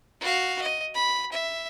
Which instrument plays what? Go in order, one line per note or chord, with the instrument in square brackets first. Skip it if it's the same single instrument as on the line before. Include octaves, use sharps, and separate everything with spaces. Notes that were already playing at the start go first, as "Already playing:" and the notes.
[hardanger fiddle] F#4 F5
D#5
B5
E5